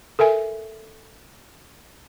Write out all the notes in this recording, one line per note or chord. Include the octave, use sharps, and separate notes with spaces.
A4 A#4 E5 G#5